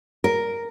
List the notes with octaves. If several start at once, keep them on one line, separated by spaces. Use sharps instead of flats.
A#4